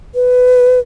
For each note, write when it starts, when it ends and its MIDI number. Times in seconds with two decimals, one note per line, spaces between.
0.15 0.79 71